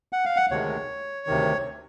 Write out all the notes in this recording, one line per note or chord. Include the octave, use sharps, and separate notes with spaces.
F#5
F5
F#5
D2 C3 D#3 G#3 C#5
D2 C3 D#3